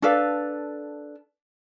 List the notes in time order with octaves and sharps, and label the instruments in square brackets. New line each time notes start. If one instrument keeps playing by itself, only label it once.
[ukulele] D4 A4 B4 F5